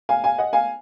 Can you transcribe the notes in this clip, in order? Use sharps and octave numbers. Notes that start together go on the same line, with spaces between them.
F5 G#5
F5 G#5
D#5 F#5
F5 G#5